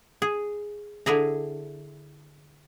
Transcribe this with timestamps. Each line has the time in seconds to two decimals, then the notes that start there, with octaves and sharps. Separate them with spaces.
0.22 G#4
1.06 D3 E4 G#4 A#5